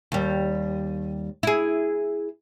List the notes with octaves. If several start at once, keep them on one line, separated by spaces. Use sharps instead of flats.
D#2 G3
E4 G#4